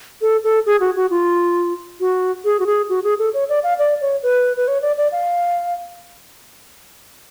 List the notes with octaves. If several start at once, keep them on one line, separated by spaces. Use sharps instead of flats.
A4
A4
G#4
F#4
F#4
F4
F#4
G#4
F#4
G#4
F#4
G#4
A4
C#5
D5
F5
D5
C#5
B4
B4
C#5
D5
D5
F5